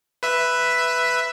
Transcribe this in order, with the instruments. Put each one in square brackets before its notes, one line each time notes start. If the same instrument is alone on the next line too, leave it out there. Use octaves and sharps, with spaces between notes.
[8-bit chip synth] B4 E5